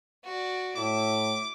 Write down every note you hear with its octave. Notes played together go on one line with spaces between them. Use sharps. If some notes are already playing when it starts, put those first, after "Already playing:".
F#4 D5
A2 E4 D6